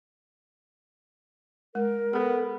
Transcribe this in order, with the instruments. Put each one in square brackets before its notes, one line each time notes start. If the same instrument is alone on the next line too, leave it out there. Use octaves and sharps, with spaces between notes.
[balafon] G#3 [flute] A#4
[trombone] B3 [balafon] G#4 A4